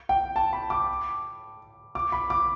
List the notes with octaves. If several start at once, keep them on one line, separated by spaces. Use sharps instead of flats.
G5
A5
B5
D6
D6
B5
D6